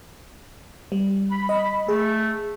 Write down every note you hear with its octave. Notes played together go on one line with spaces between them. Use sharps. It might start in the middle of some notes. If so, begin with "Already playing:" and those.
G3
B5
D#5
A3 G#4